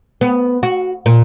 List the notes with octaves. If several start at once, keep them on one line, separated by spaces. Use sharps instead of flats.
B3
F#4
A#2